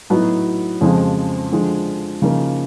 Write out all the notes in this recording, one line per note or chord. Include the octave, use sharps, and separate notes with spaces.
A2 F#3 B3 D#4
F2 C#3 F3 G#3 C4
D3 F3 G#3
C#3 F3 A#3 D#4